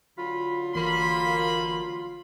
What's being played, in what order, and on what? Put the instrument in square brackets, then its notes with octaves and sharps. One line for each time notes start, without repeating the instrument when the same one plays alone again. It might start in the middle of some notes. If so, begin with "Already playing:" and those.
[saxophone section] D3 F#3 F4 [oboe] B5
[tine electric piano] G1 E3 [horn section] A#3 B5 [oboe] C6